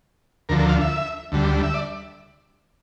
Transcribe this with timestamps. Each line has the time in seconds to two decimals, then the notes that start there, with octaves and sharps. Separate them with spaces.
0.49 D2 D3 F3 A#4
0.59 A#4
0.69 F5
0.80 E5
1.32 D2 D3 G3
1.63 E5
1.74 D5